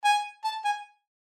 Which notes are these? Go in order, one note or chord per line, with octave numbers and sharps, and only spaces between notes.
G#5
A5
G#5